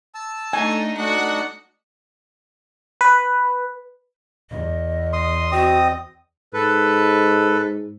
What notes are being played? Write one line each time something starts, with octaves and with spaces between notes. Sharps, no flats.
A5 E6
A3 D4 D#4 G#5
A3 D4 D#4 F#4 F#5
B4
E2 D#5
C6 D#6
C4 F#4 D#5 D#6
G#2 A4 B4